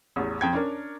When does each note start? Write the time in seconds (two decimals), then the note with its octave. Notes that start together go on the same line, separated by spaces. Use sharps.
0.16 A1 E2
0.41 F2 G5 G#6
0.53 C#4 D4 A#4